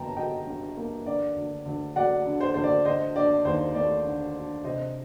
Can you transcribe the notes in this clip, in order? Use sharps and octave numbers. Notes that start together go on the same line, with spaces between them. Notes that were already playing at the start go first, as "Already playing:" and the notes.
Already playing: G1 G2 A#3 G5 A5 A#5
F#3 D#5 G5
G2
A#3
D3 D5
D2
D2
F#3 D5 F#5
D3
C5
D2 C5
D5
D3 C5 D#5
D4 D5
D#2 C5
A3 D5
D3
D4
C3 C5 D#5